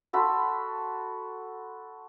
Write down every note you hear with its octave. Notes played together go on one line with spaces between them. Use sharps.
F#4 A4 B5 C6